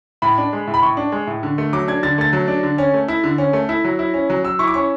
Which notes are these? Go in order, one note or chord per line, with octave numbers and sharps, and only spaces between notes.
A2 B5
D4
G#3
A2
B5
A2 C#6
D4
G#3
A2
D3
A3
F#3 D6
D4 G#6
D3 A6
A3 A6
F#3
D4
D3
C#4
A3
E4
D3
C#4
A3
E4
F#3
E4
C#4
F#3
F#3 E6
E4 C#6
D6
C#4 C#6